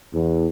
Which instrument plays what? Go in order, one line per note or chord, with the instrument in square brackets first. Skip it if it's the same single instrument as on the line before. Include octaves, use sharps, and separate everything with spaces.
[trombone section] E2